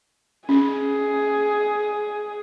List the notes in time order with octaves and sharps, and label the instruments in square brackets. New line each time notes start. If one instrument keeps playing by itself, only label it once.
[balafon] C#4 [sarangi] G#4